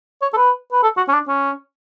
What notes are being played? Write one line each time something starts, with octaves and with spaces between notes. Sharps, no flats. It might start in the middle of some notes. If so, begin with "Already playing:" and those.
C#5
A4
B4
B4
A4
F#4
C#4
D4
C#4